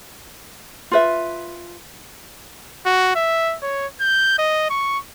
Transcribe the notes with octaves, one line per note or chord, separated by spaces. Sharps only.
F4 B4 E5
F#4
E5
C#5
G6
D#5
C#6